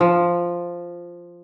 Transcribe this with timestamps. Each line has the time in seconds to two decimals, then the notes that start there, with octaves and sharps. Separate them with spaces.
0.01 F3